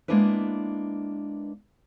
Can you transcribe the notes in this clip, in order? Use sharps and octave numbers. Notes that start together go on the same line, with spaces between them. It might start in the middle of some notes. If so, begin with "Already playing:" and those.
G#3 A#3 B3 D4 E4 B4